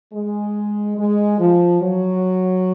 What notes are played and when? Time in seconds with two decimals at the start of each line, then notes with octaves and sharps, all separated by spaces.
0.13 G#3
0.97 G#3
1.39 F3
1.81 F#3